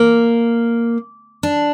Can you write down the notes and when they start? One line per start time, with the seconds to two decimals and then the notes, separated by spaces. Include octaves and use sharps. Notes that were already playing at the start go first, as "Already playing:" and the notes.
Already playing: A#3
1.43 D4